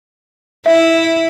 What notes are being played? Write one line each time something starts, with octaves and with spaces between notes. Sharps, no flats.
E4 E5